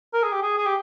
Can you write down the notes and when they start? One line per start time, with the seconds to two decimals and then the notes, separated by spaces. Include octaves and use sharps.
0.14 A#4
0.23 G#4
0.33 G4
0.43 G#4
0.58 G#4
0.66 G4